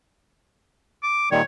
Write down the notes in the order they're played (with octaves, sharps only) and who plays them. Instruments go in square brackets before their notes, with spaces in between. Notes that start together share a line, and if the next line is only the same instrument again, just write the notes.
[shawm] D6
[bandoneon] A#2 D#3 G3 [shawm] C#5